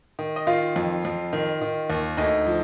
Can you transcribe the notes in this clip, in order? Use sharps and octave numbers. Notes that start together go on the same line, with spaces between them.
D#3
D#5
D#3 F4 F5
F2
F2
D#3
D#3
D#2
D2 D#4 D#5
F3